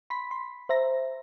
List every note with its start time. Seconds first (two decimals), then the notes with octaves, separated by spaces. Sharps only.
0.10 B5 C6 B6
0.31 C6
0.69 C5 E5 A#5 A#6